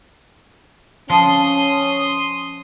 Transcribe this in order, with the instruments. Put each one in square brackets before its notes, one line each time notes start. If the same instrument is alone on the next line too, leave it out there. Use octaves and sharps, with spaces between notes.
[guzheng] F3 [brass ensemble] C#4 [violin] C6 D#6